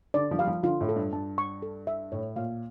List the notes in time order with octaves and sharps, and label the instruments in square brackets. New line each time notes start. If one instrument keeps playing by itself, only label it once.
[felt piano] D3 [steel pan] D5
[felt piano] F3
[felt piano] G3 [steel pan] F5
[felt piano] F3
[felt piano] D3 [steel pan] F4
[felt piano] A2
[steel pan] A4
[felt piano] G2
[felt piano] G2 [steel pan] A5
[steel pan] C#6
A4
E5
[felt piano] A2 [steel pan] C#5
[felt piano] A#2 [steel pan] F5